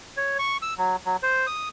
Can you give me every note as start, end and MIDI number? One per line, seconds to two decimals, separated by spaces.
0.17 0.37 73
0.39 0.57 85
0.62 0.74 88
0.78 0.96 54
1.05 1.17 54
1.23 1.46 72
1.47 1.69 87